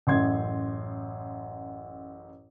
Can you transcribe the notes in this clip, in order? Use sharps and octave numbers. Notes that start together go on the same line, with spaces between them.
A1 F#2 C6 G#6